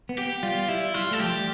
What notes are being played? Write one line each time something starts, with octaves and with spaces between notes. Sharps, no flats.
B3
G4
G3 F4
G3 E4
G3 F4
A3 A4
F3 G4
G3